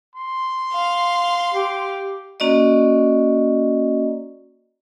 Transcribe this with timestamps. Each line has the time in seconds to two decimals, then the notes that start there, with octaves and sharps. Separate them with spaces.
0.16 C6
0.73 F5
1.54 G4
2.40 A#3 C#4 F#4 D5 D#5